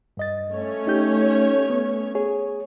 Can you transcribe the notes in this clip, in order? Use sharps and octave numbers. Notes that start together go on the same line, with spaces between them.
G2 D#5 A6
A3 C#4 C#5
D#4 G4 G6
B3
G#4 C#5